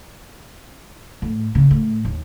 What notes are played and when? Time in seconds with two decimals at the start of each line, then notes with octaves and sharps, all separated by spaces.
1.22 A2
1.55 C#3
1.71 A2
2.05 D#2